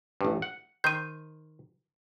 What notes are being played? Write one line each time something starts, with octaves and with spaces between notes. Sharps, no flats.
A1 G2
F#5
D#3 C5 G6 D#7